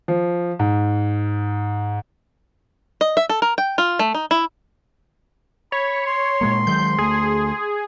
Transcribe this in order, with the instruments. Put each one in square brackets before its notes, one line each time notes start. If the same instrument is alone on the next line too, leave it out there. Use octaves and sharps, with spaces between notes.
[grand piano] F3
G#2
[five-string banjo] D#5
E5
A4
A#4
G5
F4
A3
D#4
E4
[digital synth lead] C#5 [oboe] B5
[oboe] C6
[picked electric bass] A#2 G#3 A#3
[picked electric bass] D#3 F#3 G#3 [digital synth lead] G6
[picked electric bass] D2 A3 [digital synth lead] G#4